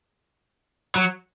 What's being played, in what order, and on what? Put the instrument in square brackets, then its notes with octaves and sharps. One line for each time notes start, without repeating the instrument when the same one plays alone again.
[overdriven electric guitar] F#3